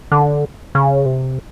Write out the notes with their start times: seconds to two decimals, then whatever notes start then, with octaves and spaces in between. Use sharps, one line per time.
0.12 D3
0.75 C#3
1.06 C3